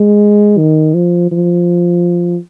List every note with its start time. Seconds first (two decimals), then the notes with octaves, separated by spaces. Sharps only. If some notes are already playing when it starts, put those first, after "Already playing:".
Already playing: G#3
0.58 D#3
0.94 F3
1.32 F3